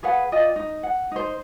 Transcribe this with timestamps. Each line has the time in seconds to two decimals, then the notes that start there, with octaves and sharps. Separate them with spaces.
0.03 G#4 B4 F5 F#5
0.32 F4 D5 D#5 G5
0.56 D#4
0.83 F#5
1.12 D#4 C5